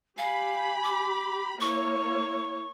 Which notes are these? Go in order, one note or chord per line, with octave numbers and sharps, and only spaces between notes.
G4 F5 G#5 B5
D6
A#3 E4 C#5 C#6